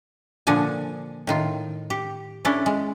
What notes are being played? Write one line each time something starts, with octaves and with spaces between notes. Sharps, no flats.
A#2 D3 F3 D4 G#5
A2 D#3 F4
G4
C#4 D4 E4 A4
G#3